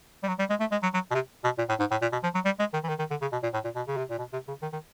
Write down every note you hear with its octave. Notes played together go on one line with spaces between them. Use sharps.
G3
F#3
G3
G#3
A3
G#3
F#3
F#3
B2
C3
B2
A#2
A2
G#2
A2
A#2
B2
F3
F#3
G3
G#3
D#3
E3
D#3
D#3
D3
C#3
B2
A#2
A2
A#2
B2
C#3
C3
A#2
B2
C3
C#3
D#3
D#3